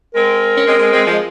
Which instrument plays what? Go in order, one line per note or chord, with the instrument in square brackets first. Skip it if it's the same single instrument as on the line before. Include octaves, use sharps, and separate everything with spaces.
[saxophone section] G#3 C4 [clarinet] A#4
[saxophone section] C#4
G#3 C4
G#3 C4
G#3 C4
F3 G#3